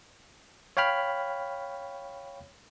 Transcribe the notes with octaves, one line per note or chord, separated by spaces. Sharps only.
C#5 F5 G5 B5 F6